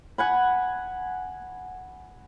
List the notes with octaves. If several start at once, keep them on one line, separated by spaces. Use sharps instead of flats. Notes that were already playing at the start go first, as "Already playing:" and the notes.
F#5 G#5 B5